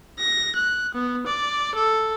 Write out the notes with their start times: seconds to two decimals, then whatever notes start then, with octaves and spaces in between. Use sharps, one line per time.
0.19 A#6
0.55 F#6
0.94 B3
1.27 D5
1.75 A4